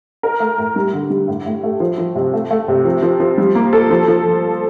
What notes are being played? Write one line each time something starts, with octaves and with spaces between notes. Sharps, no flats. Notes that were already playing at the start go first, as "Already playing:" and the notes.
A#4
A3
A2
G3
D3
G3
A2
A2
A3
F3
F3
C3
A3
A3
C3
F3
F3
F3
G3
A#3
A4
F3
F3